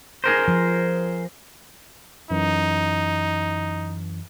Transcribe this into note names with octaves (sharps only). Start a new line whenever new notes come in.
G#4 A#4 C5
F3
F#2 E3 D#4